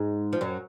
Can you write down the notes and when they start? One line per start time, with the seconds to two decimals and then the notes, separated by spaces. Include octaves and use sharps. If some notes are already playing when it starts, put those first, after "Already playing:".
Already playing: G#2 G#3
0.33 F3
0.41 F#2 F#3